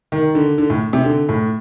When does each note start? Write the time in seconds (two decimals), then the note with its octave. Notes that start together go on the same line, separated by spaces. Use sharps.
0.12 D#3
0.35 D3
0.58 D3
0.70 A2
0.93 C3
1.05 D3
1.29 A2